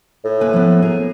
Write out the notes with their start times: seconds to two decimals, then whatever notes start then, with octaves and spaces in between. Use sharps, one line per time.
0.24 A2
0.41 A#3 B4 G#5
0.53 F3 B3
0.82 G#4 A#4